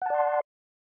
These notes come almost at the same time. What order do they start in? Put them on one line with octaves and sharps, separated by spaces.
F#5 A5 D5 C6